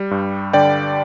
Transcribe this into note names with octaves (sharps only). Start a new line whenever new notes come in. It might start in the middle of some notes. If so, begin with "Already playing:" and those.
Already playing: G3
G2
D3 D5 G5